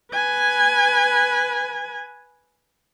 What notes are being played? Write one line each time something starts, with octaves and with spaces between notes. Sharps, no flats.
B4 G#5